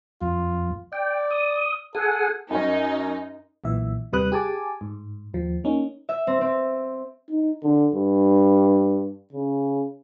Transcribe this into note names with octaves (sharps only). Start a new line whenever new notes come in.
F2 F4
D5 G5
D#6
G#4 A4 F#5 G#5
F#2 C#4 D#4
B1 A#2 E3 E5
D#2 C3 G3 B4 D#6 F#6
G4 G#4 G#5 A5 D6
G#2
D#2 F3
A#3 C#4 D#4
E5
C4
C4
D#4
D3
G2
C#3